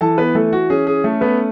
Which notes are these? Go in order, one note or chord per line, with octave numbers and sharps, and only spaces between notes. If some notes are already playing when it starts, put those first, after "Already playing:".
E3 A4 A5
B3 B4
E3 A3 A4
F#4
C#4 G#4
G#4
A3 A4
B3 B4